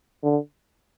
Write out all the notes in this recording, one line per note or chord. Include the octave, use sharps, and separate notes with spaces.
D3